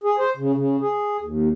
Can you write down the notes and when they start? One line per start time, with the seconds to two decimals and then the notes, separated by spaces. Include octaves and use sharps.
0.04 G#4
0.18 C5
0.37 C#3
0.55 C#3
0.81 G#4
1.22 D#2